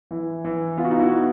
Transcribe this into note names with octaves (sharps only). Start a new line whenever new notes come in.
E3 E4
E3
B3 F4
F#4
D#4 F4
E4 F#4
B3 D#4